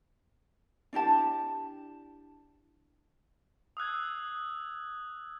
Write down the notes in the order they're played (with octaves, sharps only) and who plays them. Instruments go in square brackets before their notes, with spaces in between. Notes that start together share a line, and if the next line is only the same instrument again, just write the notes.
[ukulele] D4 E4 G4 A5
[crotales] D#6 E6 F#6 G#6